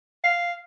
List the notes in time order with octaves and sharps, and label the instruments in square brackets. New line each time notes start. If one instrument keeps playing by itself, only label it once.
[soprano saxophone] F5